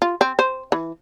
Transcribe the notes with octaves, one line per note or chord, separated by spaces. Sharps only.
F4
C4
C5
E3